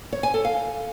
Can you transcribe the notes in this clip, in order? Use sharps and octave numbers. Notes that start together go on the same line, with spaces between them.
C#5
G#5
A4
F5